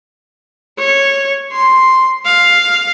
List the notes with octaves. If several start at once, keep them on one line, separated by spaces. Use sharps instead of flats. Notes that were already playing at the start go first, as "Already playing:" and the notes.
C#5
C6
F5